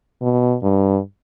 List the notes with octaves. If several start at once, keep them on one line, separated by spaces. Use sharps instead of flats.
B2
G2